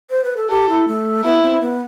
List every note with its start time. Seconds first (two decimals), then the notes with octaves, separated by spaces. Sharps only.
0.10 C5
0.24 B4
0.37 A4
0.50 G4 A4
0.69 E4
0.88 A3
1.24 B3 E4
1.43 C4
1.61 B3